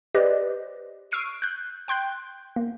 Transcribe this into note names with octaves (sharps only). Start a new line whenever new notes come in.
G4 B4 C5 D5 D#5
C#6 E6 F6 C7 D7 D#7
F#6 G6
G5 C6 F#6 G6
A#3